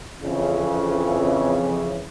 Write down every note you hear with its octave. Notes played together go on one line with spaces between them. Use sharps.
F2 C#3 E3